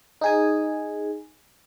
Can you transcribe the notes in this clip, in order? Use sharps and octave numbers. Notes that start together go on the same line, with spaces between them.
D#4 G#4 G#5